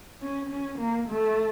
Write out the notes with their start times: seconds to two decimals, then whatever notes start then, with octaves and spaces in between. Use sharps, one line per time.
0.22 C#4
0.50 C#4
0.79 A#3
1.08 A3